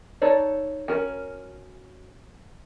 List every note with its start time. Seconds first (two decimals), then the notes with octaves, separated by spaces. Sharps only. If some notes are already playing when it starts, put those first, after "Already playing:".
0.22 D#4 A4 C#5 D5
0.88 C#4 F#4 A#4